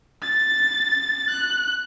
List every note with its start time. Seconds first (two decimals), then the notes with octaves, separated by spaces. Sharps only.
0.22 A6
1.30 F#6